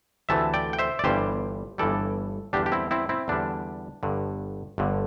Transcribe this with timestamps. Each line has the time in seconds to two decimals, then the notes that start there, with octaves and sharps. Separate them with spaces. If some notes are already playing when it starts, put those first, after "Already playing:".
0.29 D2 C3 E3 A3 E5 A5
0.54 D5 G5
0.73 G5
0.79 C5 E5
0.99 D5
1.04 G1 G2 E3 G3 G4 C5
1.78 G1 G2 E3 G3 A4 D5
2.53 E2 D3 G3 D4 G4
2.66 G4
2.72 C4 E4
2.91 C4 E4
3.09 C4 E4
3.28 E2 D3 G3 D4
4.03 G1 G2 D3
4.78 G1 G2 D3